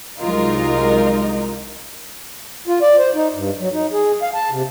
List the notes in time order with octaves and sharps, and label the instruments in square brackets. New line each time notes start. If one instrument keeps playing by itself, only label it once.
[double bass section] C2 F#3 G#3 [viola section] D#4 [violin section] F4 A#4
[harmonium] F4
D5
C5
D#4
G2
F#3
D#4
G#4
F5
A5
C3